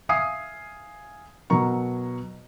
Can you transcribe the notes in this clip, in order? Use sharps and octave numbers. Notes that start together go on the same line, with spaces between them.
E5 F5 G#5 D#6 C7
B2 F#3 A#4 A#5 C#6